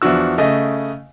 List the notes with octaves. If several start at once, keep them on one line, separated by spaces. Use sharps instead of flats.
E2 F3 D4 F#4 E6
C#3 A3 D#5